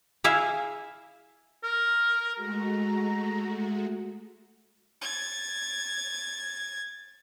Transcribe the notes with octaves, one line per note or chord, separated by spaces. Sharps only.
E4 G#4 E5 F5
A#4
G#3 A3 F#4 A#5
G#6 A6